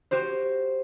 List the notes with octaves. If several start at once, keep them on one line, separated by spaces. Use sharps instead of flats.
F#4 G4 C5